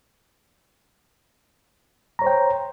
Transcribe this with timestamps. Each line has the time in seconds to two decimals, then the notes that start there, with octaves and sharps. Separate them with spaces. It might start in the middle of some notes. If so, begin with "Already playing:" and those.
2.19 A#5
2.22 C#5
2.24 C5
2.27 G5